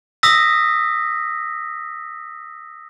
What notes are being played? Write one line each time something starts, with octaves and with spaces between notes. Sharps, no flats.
D#6 E6 A#6 B6